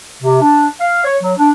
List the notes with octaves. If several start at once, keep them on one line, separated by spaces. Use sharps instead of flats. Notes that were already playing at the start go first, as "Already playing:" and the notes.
C3
D4
F5
C#5
F#3
D4